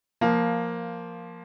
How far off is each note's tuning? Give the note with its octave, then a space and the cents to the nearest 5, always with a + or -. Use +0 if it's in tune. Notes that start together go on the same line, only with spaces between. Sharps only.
F3 +0 A#3 +5